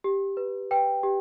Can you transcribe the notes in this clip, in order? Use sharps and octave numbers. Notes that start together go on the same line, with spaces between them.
G4
B4
B4 G5
G4